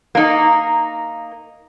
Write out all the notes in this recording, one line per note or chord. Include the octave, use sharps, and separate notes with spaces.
A#3 D#4